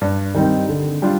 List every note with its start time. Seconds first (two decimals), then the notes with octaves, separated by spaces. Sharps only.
0.01 G2
0.34 D#3 G3 C4 D#4
0.69 D3
1.02 G3 D4 F4